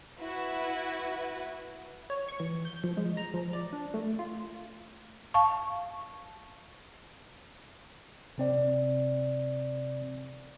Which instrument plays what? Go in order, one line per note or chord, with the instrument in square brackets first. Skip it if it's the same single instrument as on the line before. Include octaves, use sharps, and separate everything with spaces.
[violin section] E4 F#4 B4
[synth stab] C#5
C#6
E3
G6
F3
G#3
A#5
F3
D5
D4
A3
F4
[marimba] F5 A5 C#6
[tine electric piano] C3 C4 D5